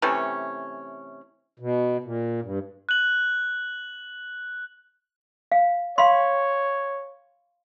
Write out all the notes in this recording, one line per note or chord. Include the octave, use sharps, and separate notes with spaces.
C3 E3 A3 C#4
B2
A#2
G2
F#6 F#7
F5
C#5 F5 B5 C6